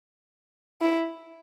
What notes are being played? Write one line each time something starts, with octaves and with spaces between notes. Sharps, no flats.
E4